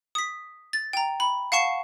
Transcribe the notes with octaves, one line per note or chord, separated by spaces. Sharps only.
D#6 B6
A6
G5 A#5
B5
F5 F#5 A5 C#6 C7 E7